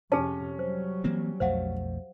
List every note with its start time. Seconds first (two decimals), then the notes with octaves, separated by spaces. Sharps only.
0.12 F2 C3 C#4 G#4 A5
0.59 F#3 G3 C5
1.04 E3 A#3 C4
1.40 B1 F2 A3 C5 F5 F#5